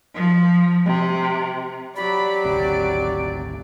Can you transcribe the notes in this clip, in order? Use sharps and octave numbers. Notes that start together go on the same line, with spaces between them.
F3
C3
F#3 G4 D5 B5
G#1 D2 C3 D7